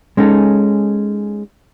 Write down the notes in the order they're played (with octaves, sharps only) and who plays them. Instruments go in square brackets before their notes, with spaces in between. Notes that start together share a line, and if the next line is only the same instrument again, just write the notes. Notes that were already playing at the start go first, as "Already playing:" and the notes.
[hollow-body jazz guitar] G#3 C#4 D#4 A4